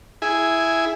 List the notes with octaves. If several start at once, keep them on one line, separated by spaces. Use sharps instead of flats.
E4 G#4